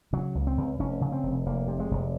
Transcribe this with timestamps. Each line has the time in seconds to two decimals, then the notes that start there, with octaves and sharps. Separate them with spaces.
0.13 C#3 F#3
0.35 C#2
0.47 C4
0.58 C#2
0.79 F1 C#4
1.01 C#3
1.12 C4
1.23 F1
1.46 F1 A#3
1.68 C3
1.80 G#3
1.91 F1